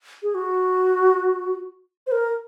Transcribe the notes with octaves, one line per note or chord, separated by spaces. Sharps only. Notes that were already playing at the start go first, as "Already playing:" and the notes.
G#4
F#4
C5
A#4